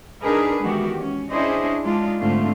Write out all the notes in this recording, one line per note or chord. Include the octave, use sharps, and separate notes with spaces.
D4 D#4 G#4 A#4 B4
D#3 E3 G#3 B3 F#4 G4
C#4
C#4 D4 E4 G#4 C5 D#5
G#3 D4 D#4 F4
G#2 D3 A3 C4 F4